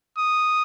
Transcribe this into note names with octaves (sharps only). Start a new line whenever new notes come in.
D#6